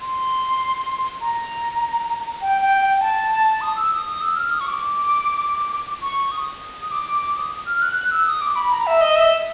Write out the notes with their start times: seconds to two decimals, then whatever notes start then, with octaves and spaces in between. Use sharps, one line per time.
0.01 C6
1.21 A#5
2.42 G5
2.61 G5
2.82 G5
3.01 A5
3.31 A5
3.61 D#6
3.76 E6
3.91 D#6
4.06 D#6
4.21 E6
4.36 F6
4.51 D#6
4.61 C#6
4.66 D6
6.02 C#6
6.31 D#6
6.82 D#6
6.91 D6
7.21 D6
7.37 D#6
7.66 F6
7.82 F#6
7.96 F#6
8.11 E6
8.27 D#6
8.41 D6
8.56 B5
8.72 A#5
8.87 E5
9.01 D#5
9.16 E5